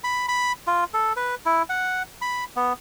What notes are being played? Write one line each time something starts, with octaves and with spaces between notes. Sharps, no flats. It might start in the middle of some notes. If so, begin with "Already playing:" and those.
B5
B5
F4
A4
B4
E4
F#5
B5
B3